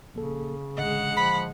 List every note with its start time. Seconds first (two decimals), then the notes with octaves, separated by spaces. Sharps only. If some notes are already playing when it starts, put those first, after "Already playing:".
0.14 A#1 C#3 A#3 A4
0.78 A1 D3 G#3 D#5 F#5
1.17 F3 B5